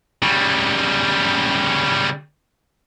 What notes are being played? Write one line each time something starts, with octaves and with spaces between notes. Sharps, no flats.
C#3 G3